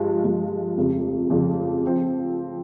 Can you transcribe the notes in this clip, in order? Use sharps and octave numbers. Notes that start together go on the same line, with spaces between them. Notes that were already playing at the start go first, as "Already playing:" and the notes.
Already playing: G2 F3 G#3
G2 F3 G#3
F1 F2 C#3 F3
F1 F2 C#3 F3
F3 C4